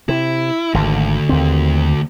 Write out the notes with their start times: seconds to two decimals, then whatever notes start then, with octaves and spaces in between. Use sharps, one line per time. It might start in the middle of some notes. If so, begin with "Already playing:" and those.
0.09 C3 E4
0.74 G#1 D2 D3
1.29 D#2 C4